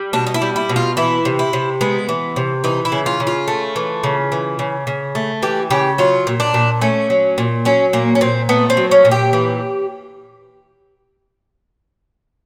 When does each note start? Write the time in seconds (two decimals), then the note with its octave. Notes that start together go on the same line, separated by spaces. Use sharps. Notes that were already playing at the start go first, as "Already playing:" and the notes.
Already playing: G3
0.13 B2 D4
0.27 D#4
0.34 E4
0.42 G3
0.56 E4
0.69 B2
0.76 F4
0.97 E3 E4
1.25 C3
1.39 E4
1.53 C3
1.81 G#3 B3
2.09 E3
2.36 C3
2.64 E3 D#4
2.85 E4
2.92 C#3
3.06 F4
3.20 C#3
3.27 F4
3.48 A3
3.76 E3
4.04 C#3
4.32 E3
4.59 C#3
4.87 C#3
5.15 A3
5.42 E3 G4
5.70 C#3 G4
5.98 F#3 F4
6.27 A#2
6.40 D4
6.54 A#2
6.81 A3 C#4
7.10 F#3
7.38 A#2
7.65 F#3 C#4
7.93 A#2 A#3
8.15 C#4
8.21 A#2 C4
8.49 A3 B3
8.70 C4
8.77 F#3
8.91 C#4
9.05 A#2
9.11 G4
9.33 E3